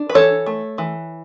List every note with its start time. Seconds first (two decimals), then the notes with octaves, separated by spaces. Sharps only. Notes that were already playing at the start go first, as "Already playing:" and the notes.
Already playing: D4
0.09 B4
0.14 E3 A4 C#5
0.46 A3
0.78 E3